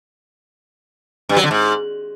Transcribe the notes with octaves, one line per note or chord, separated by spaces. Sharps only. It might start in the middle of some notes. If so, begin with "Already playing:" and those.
G2
F#3
D3
G#2